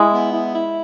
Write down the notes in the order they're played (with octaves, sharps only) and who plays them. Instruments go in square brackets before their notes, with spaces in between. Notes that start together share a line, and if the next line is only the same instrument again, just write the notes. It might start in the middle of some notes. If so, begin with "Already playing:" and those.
Already playing: [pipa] G#3 [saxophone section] E4
[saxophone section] B3
E4
E4